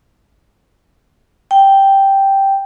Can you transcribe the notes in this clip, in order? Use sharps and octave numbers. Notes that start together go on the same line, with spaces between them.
G5